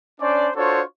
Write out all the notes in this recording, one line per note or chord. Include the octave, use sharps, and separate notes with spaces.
C#4 D4 C5 D5
D4 F4 F#4 A4 C5 C#5